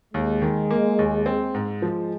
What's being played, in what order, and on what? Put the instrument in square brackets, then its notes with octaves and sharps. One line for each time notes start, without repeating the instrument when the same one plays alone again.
[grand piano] D#2 [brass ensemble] G#3
[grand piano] D#3
A#3
D#2
C4
G#2
[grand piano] F3 [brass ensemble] G#3